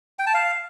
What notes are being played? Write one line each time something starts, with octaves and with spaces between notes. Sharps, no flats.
G5
A5
F5